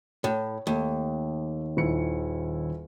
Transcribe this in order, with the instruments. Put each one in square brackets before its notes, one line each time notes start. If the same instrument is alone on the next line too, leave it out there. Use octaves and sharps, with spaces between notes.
[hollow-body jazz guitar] A2 [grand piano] C#5
[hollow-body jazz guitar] D#2 [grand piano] A3
[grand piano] D#1 E4 C#7